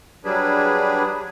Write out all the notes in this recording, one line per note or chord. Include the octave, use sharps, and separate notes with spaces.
F#3 G3 D4 G#4 B4